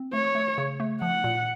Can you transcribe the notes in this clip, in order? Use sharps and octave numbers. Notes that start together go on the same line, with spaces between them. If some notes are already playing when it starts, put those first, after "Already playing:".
Already playing: C4
A3 C#5
A3
C#3
A3
F3 F#5
A#2